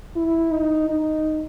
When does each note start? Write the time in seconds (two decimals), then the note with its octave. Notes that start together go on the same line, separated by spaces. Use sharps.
0.16 E4
0.52 D#4
0.88 D#4